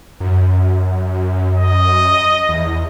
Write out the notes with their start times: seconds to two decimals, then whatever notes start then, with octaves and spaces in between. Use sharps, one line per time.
0.20 F#2
1.55 D#5
2.49 E2